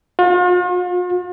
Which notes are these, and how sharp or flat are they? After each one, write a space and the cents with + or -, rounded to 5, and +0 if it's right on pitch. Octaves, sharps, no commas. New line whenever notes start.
F4 +45